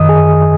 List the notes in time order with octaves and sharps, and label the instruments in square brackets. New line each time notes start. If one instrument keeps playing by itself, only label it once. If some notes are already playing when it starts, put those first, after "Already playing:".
Already playing: [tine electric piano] F#2 D#3 D#5 D#6
G#4 G#5